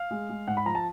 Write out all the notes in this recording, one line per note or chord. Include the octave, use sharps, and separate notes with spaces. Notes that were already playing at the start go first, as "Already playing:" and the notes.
Already playing: F5
G#3
G#3
G#2 F#5
B5
F3 A#5
A5